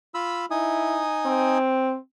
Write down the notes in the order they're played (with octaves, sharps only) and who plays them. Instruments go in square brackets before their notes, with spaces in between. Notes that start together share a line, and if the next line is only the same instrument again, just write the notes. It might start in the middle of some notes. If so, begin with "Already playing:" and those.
[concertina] F4 B5 E6
[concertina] D#4 G#5 D#6 [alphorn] E4
[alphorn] C4